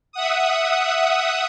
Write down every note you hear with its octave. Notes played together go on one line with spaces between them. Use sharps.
E5 F#5 D#6